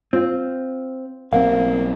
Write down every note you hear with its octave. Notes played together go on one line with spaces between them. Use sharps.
C4 F4
B1 A#3 C4 F5